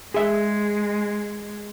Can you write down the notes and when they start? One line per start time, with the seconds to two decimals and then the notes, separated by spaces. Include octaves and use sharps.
0.14 G#3 G#4 E5